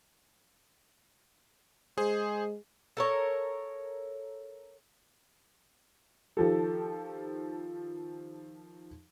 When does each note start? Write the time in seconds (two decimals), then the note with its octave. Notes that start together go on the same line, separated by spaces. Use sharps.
1.98 G#3 G#4 C5
2.97 A4 A#4 C#5
6.37 D#3 F3 G4 A4